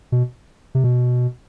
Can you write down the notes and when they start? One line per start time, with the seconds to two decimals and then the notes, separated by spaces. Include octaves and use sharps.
0.12 B2
0.75 C3
0.84 B2